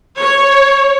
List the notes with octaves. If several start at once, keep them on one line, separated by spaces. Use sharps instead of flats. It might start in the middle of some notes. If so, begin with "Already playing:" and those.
C#5